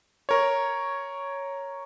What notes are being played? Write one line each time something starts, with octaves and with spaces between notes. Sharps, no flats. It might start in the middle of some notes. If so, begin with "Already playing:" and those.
A#4 C#5